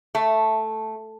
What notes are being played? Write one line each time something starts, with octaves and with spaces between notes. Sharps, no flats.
A3